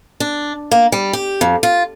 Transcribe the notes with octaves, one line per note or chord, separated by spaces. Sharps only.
D4
A#3
G3
G4
F2
F4